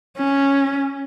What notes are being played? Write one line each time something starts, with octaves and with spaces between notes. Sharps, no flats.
C#4